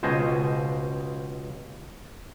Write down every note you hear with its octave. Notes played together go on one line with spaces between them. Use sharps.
C#2 B2 C5 D#5 G#5